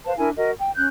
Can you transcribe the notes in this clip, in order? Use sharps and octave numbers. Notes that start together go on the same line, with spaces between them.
B4 C5 F5 A5
D4 E4 A#4 G#5
F#4 A#4 D#5
G5
C#4 F#6 G6